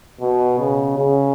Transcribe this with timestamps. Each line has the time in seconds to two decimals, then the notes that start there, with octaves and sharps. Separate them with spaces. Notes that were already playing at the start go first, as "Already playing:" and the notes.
0.21 B2
0.59 C#3
0.98 C#3